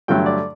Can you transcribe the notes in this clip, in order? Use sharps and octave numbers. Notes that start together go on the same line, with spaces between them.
G2 D3 F#3 A3 G5
D5